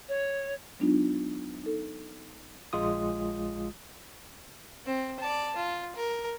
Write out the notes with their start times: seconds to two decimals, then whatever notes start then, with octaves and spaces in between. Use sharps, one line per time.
0.09 C#5
0.80 F#3 G#3 B3 D4 D#4 F4
1.64 D#4 A4
2.73 A#1 G#3 F4 D#6
4.86 C4
5.19 D5 A5
5.56 F4
5.95 A#4